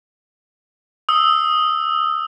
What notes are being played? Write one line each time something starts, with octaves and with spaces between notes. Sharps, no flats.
D#6 E6